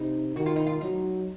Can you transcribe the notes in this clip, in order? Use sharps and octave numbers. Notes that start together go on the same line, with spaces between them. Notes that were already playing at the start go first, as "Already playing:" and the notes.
Already playing: C3 D#4
D#3 F#4
F4
D#4
F4
F#3 D#4